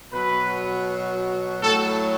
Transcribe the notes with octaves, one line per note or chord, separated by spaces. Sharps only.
B2 F#3 B4
A2 F#3 A4